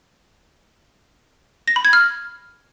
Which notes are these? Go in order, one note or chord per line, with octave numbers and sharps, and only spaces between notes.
A#6
B5
G#6
F6